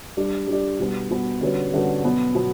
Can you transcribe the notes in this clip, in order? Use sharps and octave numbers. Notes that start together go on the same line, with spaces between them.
G3 D4 G4 D5
G3 D4 G4 D5
B2 G3 B3
B2 G3 B3
D3 G3 C#4 F#4 B4
D3 G3 C#4 F#4 B4
B2 F#3 B3
B2 F#3 B3